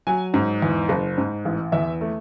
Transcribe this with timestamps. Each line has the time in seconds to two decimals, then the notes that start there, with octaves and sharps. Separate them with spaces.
0.07 F#3 G#5
0.34 G#2
0.62 E2
0.89 F#1
1.18 G#2
1.45 A1
1.72 E2 E5
2.01 A3